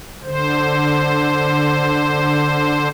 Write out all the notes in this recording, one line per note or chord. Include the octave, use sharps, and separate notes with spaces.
D3 C5